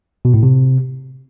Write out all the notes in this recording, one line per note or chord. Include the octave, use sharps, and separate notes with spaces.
B2
A2
C3